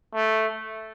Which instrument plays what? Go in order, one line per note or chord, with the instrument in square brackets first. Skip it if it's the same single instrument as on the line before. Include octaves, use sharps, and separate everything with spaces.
[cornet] A3